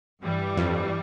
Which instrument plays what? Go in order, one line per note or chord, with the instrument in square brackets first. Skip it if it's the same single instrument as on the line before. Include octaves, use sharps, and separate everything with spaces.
[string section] G2 E3 G3
[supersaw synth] F2